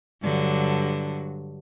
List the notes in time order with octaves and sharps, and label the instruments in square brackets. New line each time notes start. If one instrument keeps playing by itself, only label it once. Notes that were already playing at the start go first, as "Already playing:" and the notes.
[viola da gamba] G2 D3 F#3